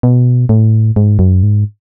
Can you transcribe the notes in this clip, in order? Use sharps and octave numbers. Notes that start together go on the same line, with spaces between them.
B2
A2
G#2
F#2
G#2